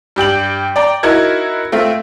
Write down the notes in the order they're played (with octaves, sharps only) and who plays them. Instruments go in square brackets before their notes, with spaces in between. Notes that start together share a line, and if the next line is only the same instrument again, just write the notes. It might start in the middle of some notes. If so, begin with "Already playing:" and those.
[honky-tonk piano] G2 G4 G5 F#7
D5 G5 A#5
D#4 E4 F#4 A#4 G#6
A3 C4 F4 E5